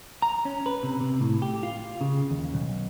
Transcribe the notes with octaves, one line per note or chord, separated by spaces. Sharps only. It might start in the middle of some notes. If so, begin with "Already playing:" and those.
A#5
C#4
B4
C3
C3
A2
G4
F4
C#3
D#2
B1